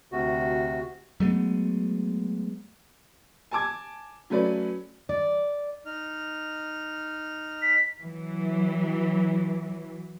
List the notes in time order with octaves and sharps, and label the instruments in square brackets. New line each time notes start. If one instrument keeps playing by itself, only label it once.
[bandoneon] D2 C3 F#4
[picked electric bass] F#3 G#3 A3 B3
[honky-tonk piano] G#5 A5 D6 G#6
F#3 A3 C#4 B4 D5
[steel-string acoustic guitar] D5
[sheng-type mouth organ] D#4 F6
[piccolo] B6
[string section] E3 F#3